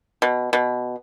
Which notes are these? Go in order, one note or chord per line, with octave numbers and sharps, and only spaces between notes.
B2
B2